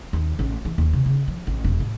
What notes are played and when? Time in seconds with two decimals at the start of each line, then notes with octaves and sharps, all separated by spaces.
0.13 D#2
0.39 A1
0.65 E3
0.78 D#2
0.93 C3
1.06 C#3
1.28 F3
1.47 A1
1.64 E1
1.80 A2